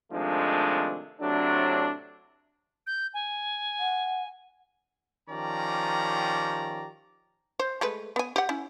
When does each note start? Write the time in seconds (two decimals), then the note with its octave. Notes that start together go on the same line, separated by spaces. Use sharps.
0.12 C3 D#3 F3 G#3 A3 D4
1.21 A2 C3 F#3 A3 D4
2.87 G6
3.14 G#5
3.79 F#5
5.29 D#3 F3 C#4 G4 D5 A#5
7.59 C5
7.81 G#3 A3 B4
8.16 B3 G#5
8.36 G4 F#5
8.49 C#4 E4